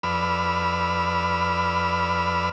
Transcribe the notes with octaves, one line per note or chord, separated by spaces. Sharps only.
F2 B4 D5 B5 E6 F6